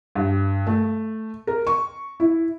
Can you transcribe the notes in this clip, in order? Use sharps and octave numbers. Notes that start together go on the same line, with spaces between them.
G2
A3
A#4
C#6
E4